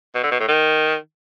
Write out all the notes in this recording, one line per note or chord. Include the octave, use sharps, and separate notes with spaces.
B2
D3
B2
A2
D#3